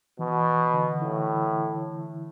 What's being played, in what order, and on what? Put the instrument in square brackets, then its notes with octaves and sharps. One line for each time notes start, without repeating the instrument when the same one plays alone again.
[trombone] B2 [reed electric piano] E3
[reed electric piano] D3
[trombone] A2 [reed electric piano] E4